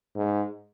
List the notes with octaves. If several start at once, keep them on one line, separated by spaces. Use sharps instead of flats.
G#2